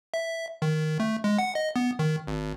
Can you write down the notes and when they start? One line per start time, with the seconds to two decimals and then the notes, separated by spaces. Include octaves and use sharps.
0.14 E5
0.62 D#3
1.00 A3
1.24 G#3
1.38 F#5
1.55 D#5
1.76 B3
1.99 D#3
2.27 G#1